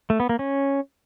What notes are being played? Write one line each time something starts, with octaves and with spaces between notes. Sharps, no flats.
A3
B3
A#3
C#4